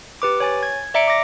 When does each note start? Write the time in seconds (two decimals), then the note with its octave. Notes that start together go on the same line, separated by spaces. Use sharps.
0.22 G4 B4 D6
0.40 C#5 G#5 A6
0.63 G#6
0.94 D5 E5 A#5 C#7 D7
1.08 D6 A#6